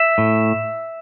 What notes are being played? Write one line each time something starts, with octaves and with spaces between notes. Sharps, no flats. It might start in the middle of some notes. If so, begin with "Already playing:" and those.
Already playing: E5
A2